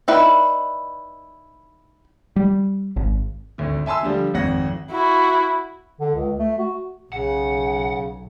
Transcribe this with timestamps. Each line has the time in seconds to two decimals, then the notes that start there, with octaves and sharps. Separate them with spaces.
0.08 D#4 E4 B4 D5
2.36 G3
2.96 G#1
3.58 G#1 D2 D3
3.86 E5 G#5 A5 C6 E6
4.03 D3 F3 G3
4.34 G#1 F2 F#5 A#6
4.91 E4 F#4
6.00 D3
6.15 C#2
6.39 A3
6.59 F#4
7.13 B1 C#3 F#5